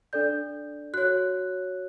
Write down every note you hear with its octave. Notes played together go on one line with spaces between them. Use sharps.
D4 A4 D5 G6
F#4 C#5 F#6